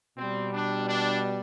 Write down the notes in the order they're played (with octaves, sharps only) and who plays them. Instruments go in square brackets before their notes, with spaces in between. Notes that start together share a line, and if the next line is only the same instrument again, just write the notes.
[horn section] B2 G3 C4
D4
D4